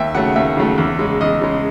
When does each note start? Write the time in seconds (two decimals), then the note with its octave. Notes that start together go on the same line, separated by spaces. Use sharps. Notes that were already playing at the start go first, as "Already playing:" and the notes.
Already playing: D#2 E5
0.14 C#3 F#3 A3 F#5
0.36 D#2 E5
0.57 C#3 F#3 A3
0.78 E2
0.99 C#3 G#3
1.21 E2 D#5
1.41 C#3 G#3